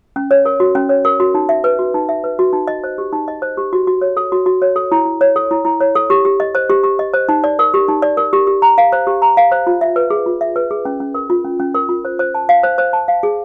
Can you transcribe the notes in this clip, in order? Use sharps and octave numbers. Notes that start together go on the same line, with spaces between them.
C#4
C#5
A#4
F#4
C#4
C#5
A#4
F#4
D#4
E5
B4
F#4
D#4
E5
B4
F#4
D#4
D#5
C5
G4
D#4
D#5
C5
G4
F#4
F#4
C#5
A4
F#4
F#4
C#5
A4
E4
E4
C#5
A4
E4
E4
C#5
A4
G4
G4
D#5
C5
G4
G4
D#5
C5
D#4
D5
A#4
G4
D#4
D5
A#4
G4
G4
A#5
F5
C5
G4
A#5
F5
C5
F4
E5
B4
G#4
F4
E5
B4
G#4
C#4
C#4
A#4
F4
C#4
C#4
A#4
F4
C5
C5
A5
F5
C5
C5
A5
F5
G#4